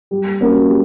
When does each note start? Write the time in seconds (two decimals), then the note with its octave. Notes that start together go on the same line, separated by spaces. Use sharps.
0.11 G3
0.40 A#3 C#4 F#4 A#4
0.69 G3